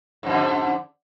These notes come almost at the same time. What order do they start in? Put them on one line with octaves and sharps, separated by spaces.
G#2 F2 D3